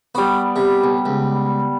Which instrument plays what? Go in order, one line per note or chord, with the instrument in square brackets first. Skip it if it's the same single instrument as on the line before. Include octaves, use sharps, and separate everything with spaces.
[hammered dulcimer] G3 B3 [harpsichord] F#4
[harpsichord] C3
B1
C#2